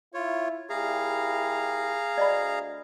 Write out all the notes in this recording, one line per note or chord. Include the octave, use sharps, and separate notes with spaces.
E4 F4 C#5
A#2 E4 G4 G#4 F5 A#5
D2 D5 D#5 B5